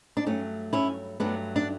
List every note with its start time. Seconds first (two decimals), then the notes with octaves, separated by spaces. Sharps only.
0.17 D4
0.26 G2 F#3 A3 C#4
0.73 C#4 E4
1.20 G2 F#3 A3 B3 D4
1.56 D4